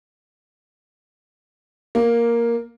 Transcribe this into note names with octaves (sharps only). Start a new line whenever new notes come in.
A#3